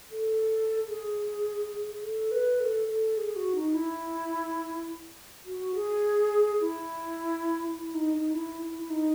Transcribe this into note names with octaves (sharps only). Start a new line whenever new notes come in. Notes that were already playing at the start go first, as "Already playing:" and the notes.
A4
G#4
A4
B4
A4
A4
G#4
F#4
D#4
E4
F#4
G#4
E4
E4
D#4
D#4
E4
E4
E4
D#4